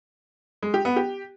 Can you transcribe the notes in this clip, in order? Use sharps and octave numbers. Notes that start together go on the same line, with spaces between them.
G#3
G4
B3
G4